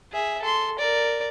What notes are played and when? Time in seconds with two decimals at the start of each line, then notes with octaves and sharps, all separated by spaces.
0.12 G#4 E5
0.42 A4 C6
0.79 A#4 D5